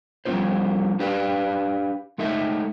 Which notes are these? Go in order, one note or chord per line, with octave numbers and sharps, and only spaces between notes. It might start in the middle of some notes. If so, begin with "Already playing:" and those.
F3 G3 B3 C#4 F4 C5
D4 G4 B4 D5 F5
G#3 A3 D#4 E5